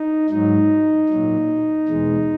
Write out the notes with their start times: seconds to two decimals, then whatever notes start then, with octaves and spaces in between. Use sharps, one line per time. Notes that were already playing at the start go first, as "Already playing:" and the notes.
Already playing: D#4
0.30 G#2 F#3 D#4
1.09 A#2 F#3
1.89 E2 B2 G#3